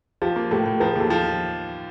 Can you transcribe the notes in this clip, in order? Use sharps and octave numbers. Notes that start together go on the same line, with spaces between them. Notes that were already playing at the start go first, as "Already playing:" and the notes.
F3 F4 G4
A#3
A2 G4 A4
A2
F3 G#4 A#4
D#2 G4 A4
F3